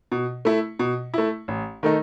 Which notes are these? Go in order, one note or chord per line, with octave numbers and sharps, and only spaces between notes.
B2
A3 E4
B2
A3 E4
A1
D#3 A3 D#4